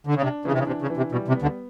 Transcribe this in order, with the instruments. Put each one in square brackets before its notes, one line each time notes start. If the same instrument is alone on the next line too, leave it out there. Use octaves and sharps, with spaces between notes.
[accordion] D3
C#3
[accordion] C3 [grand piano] D4
[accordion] C#3 [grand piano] E3
[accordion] C3
C#3
[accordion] C3 [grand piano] D4
[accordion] C#3
[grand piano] E3
[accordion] C3
[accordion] B2 [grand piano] G3
[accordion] C3
[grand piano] B3
[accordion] D2 D3